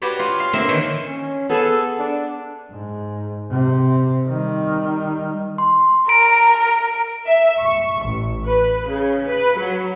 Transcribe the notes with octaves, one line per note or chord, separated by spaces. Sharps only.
F#4 G4 B4 C#5 D5
F4
F5
D3 A#3 C4 E5 C6
D#3 E3 C#5
C#4
B3 G#4 A4 E5
D4
G#2
C3
D#3 G3
C6
A#4 A#5 D7
E5
C#6
A1
B4
C#3
B4
F#3